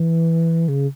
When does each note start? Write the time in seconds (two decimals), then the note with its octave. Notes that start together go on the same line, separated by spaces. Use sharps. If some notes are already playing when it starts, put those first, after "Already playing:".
Already playing: E3
0.68 C#3